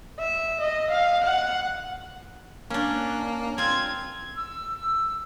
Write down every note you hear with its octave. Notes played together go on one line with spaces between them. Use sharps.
E5
D#5
F5
F#5
A#3 C#4 D4
C4 F4 G#6
E6